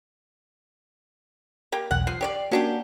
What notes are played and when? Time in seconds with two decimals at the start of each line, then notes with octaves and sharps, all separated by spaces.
1.72 A#3 G4
1.91 B1 E2 F#5 F#6
2.07 F3 C7
2.21 G4 C#5 D5
2.51 A#3 C#4 D4 F#4 G4 A#4